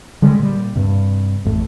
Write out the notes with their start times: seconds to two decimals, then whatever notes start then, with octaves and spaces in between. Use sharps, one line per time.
0.22 D3 G3 G#3
0.39 A#2 G3
0.75 G2 C3
1.45 A1 F2 A2